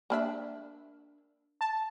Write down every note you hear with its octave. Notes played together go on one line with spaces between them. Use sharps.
A#3 D4 E5
A5